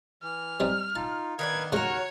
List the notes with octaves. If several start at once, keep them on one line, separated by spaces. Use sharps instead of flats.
E3 F6
G3 C4 D#4
D#4 F4 A5
D#3 B3 D4 A#4 B4 F5 G#6
D#2 C#3 G#3 F#4 A#4 C#5 A#5